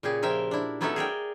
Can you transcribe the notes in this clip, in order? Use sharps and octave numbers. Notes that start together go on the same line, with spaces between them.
A#2 C#3 G4 G#4
F3 A#4 E5 G5
D4 E4
F#3 B3 C#4 D#4 A4 E5
G#4 A#4 D5 G5